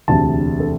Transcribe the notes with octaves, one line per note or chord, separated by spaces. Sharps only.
E1 D2 C3 A5
A4